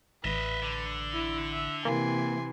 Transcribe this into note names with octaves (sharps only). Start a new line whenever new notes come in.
A1 B4 D#5 E5
D3
E4
E5
C3 E3 A#3 G#5 C6